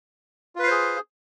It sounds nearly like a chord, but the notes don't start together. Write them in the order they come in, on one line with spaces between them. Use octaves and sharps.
F4 B4 F5 C5 G#4